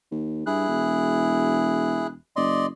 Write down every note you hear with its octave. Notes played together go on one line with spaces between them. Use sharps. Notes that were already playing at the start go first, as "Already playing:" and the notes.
D#2
G2 E4 G#4 F#6
E1
F#1 D5 D#5 C6